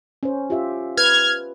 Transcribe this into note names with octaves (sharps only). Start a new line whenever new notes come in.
C#4 C5
F4 G4 E5
B4 F6 G#6